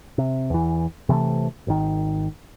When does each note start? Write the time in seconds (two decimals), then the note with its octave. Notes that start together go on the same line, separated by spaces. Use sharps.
0.18 C3
0.50 E2 E3
1.09 C3 E3 G3 A3
1.67 G#1 D#3